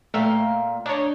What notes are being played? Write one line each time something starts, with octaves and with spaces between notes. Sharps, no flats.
A#2 A3 E5 F5 G5
D4 D#4 C#5